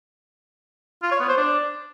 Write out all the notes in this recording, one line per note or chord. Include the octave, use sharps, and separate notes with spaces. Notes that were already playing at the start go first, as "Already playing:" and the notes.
F4
C#5
B3
C5
D4